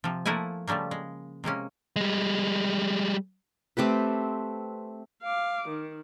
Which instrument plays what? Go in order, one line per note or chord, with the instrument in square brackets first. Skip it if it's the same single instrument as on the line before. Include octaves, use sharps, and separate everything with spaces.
[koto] C3 F3
F3 A3 A#3 E4 F#5 G#5
C#3 F3 G3 A3 A#3
G#3
C3 G#3 A#3 C#4
[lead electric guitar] G3 G#3
[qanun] A3 C4 G4 B4
[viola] F5 D6
D#3